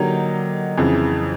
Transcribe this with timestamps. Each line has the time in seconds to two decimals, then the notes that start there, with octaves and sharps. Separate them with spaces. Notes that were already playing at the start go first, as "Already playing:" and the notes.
Already playing: D3 F#3 A#3 D#4 G4
0.78 F2 C#3 E3